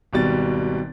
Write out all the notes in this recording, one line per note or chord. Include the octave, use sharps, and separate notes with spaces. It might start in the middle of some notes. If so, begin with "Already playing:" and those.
G#1 B2 G3 A6